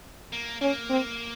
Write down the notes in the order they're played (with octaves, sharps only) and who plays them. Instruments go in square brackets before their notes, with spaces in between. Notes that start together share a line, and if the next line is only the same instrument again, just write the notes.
[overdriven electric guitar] A#3
[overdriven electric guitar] A#3 [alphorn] C#4
[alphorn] C4